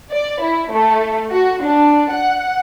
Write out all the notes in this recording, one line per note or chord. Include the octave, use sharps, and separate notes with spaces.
D5
E4
A3
F#4
D4
F#5